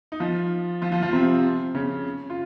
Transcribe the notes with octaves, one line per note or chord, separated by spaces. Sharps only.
D#4
F3 F4
F3 F4
F3 F4
F3 F4
C3 C4
C#3 C#4
F4